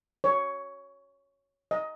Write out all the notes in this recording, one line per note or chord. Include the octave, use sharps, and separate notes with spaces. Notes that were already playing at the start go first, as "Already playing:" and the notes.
C#5
D#5